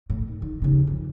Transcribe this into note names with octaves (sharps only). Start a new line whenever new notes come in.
A2
D#3
D#3
D#2 C#3
F2